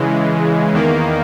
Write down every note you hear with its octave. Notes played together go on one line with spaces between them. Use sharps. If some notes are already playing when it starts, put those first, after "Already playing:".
Already playing: C#3 E3 G#3
E2 D#3 A#3